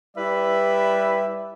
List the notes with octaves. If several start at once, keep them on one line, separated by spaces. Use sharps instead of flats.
G3 E4 B4 D5 E5